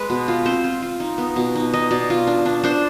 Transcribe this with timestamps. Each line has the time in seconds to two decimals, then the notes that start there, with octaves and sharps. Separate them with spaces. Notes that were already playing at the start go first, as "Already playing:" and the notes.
Already playing: G#3 B4
0.10 B2
0.28 F4
0.45 C4 C5
0.64 F4
0.82 F4
1.00 D#4
1.18 B3
1.36 B2
1.56 D#4
1.73 D#4 D#5
1.91 B2 D5
2.10 F4
2.27 D4
2.46 D4
2.64 D4 C5